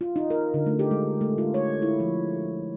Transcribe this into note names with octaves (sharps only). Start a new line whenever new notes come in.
F4
D#4
A#4
D3
A3
G4
G#3
A3
F4
C#5
E4
F3